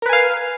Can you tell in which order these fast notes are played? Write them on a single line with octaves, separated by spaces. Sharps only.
A#4 B4 G#5 F5